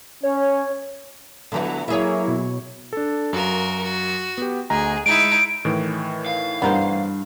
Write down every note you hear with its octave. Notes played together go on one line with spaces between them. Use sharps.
C#4 C#5
D3 F3 A3 B3 E4
F#3 A#3 E4 G#4 C#5 E5
B2
D4 A4
F#2 F#4 A#4 F5
F#4
B3 G4
D2 G#4 D#5 A#5
G#3 D#4 E4 D7
A2 D#3 E3
F5
G2 B3 A#4 C5